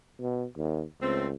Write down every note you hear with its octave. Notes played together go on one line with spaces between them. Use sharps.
B2
D#2
C#2 A3 C4